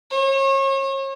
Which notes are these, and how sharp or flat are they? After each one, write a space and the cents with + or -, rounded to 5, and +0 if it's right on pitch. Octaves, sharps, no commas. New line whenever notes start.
C#5 -35